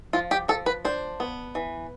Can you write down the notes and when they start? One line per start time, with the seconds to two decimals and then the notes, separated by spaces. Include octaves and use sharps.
0.13 F3 F4
0.31 G4
0.48 F3 A4
0.66 B4
0.85 D4 C5
1.20 B3
1.55 E3